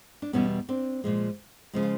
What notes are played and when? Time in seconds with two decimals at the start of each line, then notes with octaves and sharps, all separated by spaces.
0.22 D4
0.33 E2 B2 G3 B3 C#4
0.69 C4 D4
1.04 A#2 F3 G#3
1.73 C#3 F3 G#3
1.83 F4